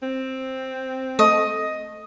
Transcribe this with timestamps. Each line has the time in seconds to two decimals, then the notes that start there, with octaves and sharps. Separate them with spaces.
0.02 C4
1.19 A3 D#5